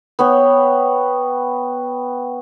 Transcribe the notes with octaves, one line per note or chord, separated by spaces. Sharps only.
B3 C#5 G5